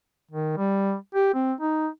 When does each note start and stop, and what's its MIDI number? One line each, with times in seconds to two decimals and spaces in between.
0.32 0.53 51
0.57 0.95 55
1.15 1.30 67
1.34 1.53 60
1.61 1.88 63